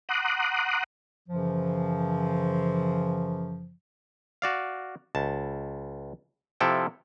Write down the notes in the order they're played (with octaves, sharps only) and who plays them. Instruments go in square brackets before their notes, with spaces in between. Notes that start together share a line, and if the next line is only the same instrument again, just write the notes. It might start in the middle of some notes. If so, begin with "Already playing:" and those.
[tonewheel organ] F#5 A#5 C6 D6 D#6 F#6
[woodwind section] F#2 C#3 E3 F3
[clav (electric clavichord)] F#4 D5 F5
C#2 A5
C3 F3 E4 A4 G5